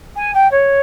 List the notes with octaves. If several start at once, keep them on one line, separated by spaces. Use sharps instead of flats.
G#5
G5
C#5